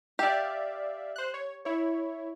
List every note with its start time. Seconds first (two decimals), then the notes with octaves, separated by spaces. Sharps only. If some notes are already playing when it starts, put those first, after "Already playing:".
0.19 G4 D5 E5 F5
1.16 C5 F#6
1.34 C#5
1.65 E4 C#5